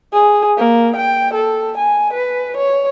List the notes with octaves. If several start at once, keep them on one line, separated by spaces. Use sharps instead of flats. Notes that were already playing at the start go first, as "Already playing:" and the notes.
G#4
A#3
G5
A4
G#5
B4
C#5